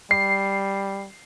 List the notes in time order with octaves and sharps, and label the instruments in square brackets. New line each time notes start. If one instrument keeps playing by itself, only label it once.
[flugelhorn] G3 [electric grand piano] C7